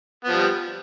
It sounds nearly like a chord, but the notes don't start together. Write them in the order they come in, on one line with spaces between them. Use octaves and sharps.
B3 F3 G3